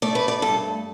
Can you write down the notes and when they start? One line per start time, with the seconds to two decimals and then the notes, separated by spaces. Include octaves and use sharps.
0.02 A3 D5
0.15 B4
0.28 D5
0.42 G2 A4